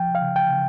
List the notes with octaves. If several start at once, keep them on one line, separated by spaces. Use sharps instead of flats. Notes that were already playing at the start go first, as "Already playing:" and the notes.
Already playing: F3 G5
F5
C#3
G5
C#3